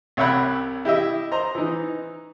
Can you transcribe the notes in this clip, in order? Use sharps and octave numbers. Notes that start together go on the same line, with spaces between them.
C2 C#5 E5 F#5 G5 B5
E4 G4 D#5 E5
C5 D#5 A#5
E3 D#4